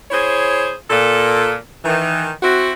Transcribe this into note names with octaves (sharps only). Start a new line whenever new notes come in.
E4 G#4 C5 C#5
A#2 A4
D#3 E3
C4 E4 F#4